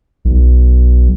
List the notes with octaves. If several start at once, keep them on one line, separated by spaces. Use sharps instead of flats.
B1